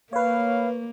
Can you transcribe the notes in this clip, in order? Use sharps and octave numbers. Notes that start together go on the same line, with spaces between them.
A#3 B4 C#5 F5